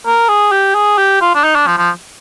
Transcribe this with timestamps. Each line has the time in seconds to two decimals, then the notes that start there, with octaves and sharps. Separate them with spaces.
0.06 A#4
0.29 G#4
0.52 G4
0.75 G#4
0.98 G4
1.21 F4
1.35 D4
1.44 D#4
1.55 D4
1.67 F3
1.78 F3